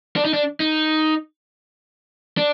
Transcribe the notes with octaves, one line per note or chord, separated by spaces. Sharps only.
D4
D#4
D4
D#4
D4